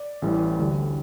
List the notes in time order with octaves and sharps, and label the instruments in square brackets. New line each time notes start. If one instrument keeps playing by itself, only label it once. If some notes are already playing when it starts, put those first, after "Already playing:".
Already playing: [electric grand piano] D5
A1 A2 E3 G3
D2 D3 G3